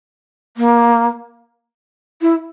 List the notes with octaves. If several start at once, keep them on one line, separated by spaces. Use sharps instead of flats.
A#3
E4